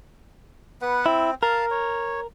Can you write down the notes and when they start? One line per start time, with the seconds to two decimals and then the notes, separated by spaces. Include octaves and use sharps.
0.82 B3 B4 F#5
1.06 C4 E4
1.43 A#4 F5 A5
1.71 C#5